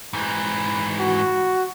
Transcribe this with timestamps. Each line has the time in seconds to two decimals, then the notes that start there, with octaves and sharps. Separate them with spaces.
0.13 G#2 E3
0.99 F#4